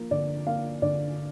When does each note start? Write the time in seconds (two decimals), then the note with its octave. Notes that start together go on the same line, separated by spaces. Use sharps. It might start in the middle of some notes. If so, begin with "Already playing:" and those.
Already playing: F3 A#3
0.11 D3 D5
0.47 A#3 F5
0.82 D3 D5